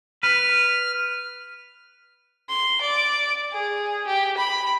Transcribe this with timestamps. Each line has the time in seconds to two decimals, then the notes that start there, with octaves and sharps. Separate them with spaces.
0.23 B4 F6
2.49 C6
2.81 D5
3.53 G#4
4.07 G4
4.37 B5